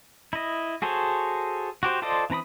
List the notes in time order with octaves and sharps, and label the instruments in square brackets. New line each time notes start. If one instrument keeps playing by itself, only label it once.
[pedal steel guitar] E4 D#5
F#4 G#4 A4 C5 C#5
F#4 G4 C5
F4 A4 C5 D5 D#5
E3 C4 A#5 B5 D#6